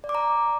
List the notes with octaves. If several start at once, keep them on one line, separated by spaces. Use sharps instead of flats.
D5
D6
A#5